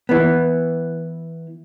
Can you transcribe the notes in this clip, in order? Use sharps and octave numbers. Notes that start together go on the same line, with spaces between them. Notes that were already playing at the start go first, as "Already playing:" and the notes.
E3 B3